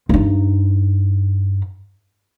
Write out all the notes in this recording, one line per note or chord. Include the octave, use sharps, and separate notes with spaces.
G2 D#4